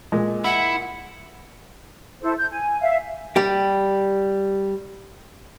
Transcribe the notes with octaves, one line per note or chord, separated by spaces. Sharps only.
A#2 G#3
E4 F#5
E4 A4 C5
G6
G#5
E5 F5
G3 G4